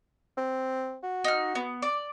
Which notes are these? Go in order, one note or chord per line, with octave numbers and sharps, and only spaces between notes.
C4
F#4
D#4 F6
B3
D5